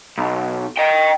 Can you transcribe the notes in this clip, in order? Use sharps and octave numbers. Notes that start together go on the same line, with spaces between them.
B1
D#5 G5